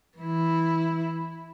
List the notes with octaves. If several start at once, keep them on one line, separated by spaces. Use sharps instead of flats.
E3 E4